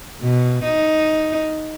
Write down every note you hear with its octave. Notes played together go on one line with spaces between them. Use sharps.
B2
D#4